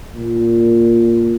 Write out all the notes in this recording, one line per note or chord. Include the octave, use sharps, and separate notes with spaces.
A#2